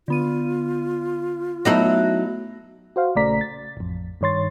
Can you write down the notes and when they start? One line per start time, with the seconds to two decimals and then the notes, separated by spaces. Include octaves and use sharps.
0.08 D3 B3 F4 D#7
1.65 F#3 A3 B3 D#4 E4 A#6
2.96 F#4 C5 F5
3.15 A#1 C#3 A3 D5 A#5 B6
3.41 A6
3.77 A1 F2
4.21 G2 D#3 C#5 C6 A6